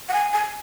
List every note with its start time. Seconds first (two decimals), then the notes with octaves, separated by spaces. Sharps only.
0.09 F#5
0.13 G#5
0.33 G#5